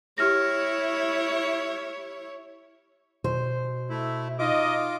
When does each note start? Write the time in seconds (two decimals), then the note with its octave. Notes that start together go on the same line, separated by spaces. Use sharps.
0.18 E4 G4 C#5 F6 A#6
3.24 B2 C5
3.90 A3 E4
4.39 D#4 F4 D#5 D6